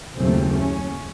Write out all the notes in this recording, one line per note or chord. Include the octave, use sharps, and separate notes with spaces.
F#1 D#2 C#3 F#3 A3 C4
C#4